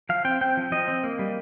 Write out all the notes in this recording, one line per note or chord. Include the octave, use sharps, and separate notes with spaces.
F3 F5
C4 G5
C4 G5
F3
F3 D#5
C4
A#3
G3